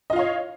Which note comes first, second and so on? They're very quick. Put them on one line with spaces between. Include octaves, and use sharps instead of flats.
D#5 F4 F5 C#5